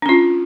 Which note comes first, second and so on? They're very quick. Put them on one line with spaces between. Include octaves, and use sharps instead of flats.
D4 C#4 F4